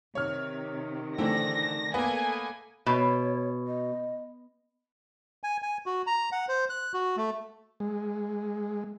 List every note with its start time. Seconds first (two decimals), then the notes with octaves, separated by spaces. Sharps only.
0.15 C3 D#3 C#5 F6
1.18 D3 E3 A3 C4 D5 A#6
1.94 A#3 B3 A4 G#5
2.86 B2 C#5
3.67 D#5
5.44 G#5
5.62 G#5
5.86 F#4
6.07 A#5
6.32 F#5
6.48 C5
6.70 F#6
6.94 F#4
7.17 A3
7.80 G#3